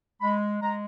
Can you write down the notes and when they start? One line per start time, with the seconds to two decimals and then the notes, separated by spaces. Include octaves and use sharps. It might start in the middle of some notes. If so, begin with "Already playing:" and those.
0.21 G#3 B5
0.62 G#3 A#5